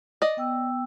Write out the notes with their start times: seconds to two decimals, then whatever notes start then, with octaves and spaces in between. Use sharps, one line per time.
0.22 D5 D#5
0.37 B3 G5 E6